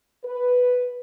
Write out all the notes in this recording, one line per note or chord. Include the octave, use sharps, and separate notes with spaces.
B4